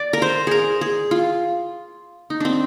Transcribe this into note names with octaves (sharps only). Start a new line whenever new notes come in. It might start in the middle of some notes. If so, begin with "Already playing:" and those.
Already playing: D5
A#4
C5
G#4 A#4
G#4
F4
D#4
C4 D4